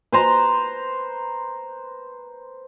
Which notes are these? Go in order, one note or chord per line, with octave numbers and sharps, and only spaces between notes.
B4 C5 A#5